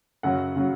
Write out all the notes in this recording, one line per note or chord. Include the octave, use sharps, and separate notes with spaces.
F#2 C#3 F#3 F#5
C#3 F#3